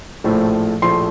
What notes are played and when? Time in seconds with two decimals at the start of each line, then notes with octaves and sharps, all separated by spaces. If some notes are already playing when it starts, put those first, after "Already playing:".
0.24 A#1 A2 F3 A3
0.82 A#1 A2 F3 A3 C6